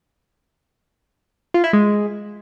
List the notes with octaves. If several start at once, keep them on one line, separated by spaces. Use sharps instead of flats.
F4
E4
G#3